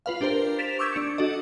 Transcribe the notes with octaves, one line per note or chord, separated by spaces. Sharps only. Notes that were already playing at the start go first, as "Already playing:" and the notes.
F4 B4 F5
D4 G4 A#4 C5
A6 B6 D7 E7 F7
C#6 D6 E6 G6 G#6 E7
D4 C#7
D4 F#4 A4 D#5